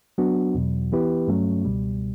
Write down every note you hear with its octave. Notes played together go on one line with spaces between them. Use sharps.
F#3 B3 D4 F#4
E2 B2 F#3
E3 B3 E4 G4 B4
G2 F#3 A3 C#4
C#2 B2 G3